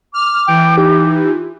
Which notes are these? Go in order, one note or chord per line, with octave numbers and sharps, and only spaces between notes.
D6 F6
E3 G5
D#4 G4
F4